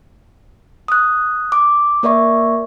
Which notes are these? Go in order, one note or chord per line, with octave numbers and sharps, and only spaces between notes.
D#6 F#6
D6
A#3 A#4 D5 E5 C#6